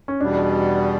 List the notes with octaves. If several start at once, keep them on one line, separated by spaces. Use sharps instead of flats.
C#4
E2 B2 G3 D4